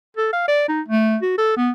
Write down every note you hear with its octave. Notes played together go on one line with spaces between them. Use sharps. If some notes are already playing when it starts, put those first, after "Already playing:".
A4
F5
D5
D#4
A3
F#4
A4
B3